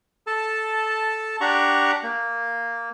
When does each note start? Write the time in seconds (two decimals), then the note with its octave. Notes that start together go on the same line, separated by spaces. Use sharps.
0.27 A4 A5
1.41 D4 G4 F#5 A#5 C#6
2.03 A#3